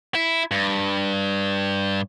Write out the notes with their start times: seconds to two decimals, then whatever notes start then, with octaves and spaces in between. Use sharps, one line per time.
0.15 E4
0.51 G2